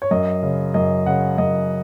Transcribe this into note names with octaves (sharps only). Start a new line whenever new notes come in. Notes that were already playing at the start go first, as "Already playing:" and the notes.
C#5
F#2 D#5
C#3
F#2 D#5
C#3 F#5
F#2 D#5